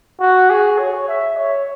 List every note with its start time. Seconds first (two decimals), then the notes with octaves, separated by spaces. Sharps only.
0.20 F#4
0.50 G#4
0.79 C#5
1.08 E5
1.37 C#5